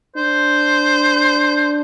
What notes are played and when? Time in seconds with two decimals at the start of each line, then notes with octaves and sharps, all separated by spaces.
0.16 D4 C5